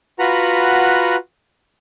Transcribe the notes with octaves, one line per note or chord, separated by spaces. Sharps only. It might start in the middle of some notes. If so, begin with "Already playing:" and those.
F4 F#4 B4 F#5 A#5 B5